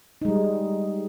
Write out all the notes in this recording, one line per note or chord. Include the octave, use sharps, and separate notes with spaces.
G3 G#3 D#4